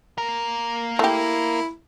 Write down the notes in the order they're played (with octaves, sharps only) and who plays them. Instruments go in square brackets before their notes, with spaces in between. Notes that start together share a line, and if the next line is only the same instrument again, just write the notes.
[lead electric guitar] A#3 A#4
[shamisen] A3 G4 [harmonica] E4